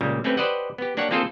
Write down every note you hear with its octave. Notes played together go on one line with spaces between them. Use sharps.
C#2 A#2 C#3 G3
A3 C4 C#4 G4 B4
G4 B4 C5 D5 D#5 F#5
B3 G4
A#3 D4 G4 C#5 F#5
A#3 C4 F4 G#4 A4 C5